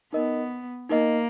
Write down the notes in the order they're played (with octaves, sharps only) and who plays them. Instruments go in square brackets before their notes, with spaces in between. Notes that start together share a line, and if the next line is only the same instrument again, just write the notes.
[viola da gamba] B3 [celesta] D#4 A#4 D#5
[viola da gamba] A#3 [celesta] D#4 A#4 D#5